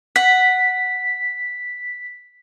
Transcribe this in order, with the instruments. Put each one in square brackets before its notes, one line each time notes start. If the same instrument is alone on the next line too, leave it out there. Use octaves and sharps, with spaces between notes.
[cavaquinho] F#5 [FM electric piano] B6